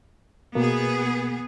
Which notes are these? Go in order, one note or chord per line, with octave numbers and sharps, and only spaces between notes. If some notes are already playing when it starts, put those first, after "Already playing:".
B2 A#3 B3 G#4